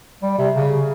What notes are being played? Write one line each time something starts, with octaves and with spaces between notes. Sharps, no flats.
G3
C3
C#3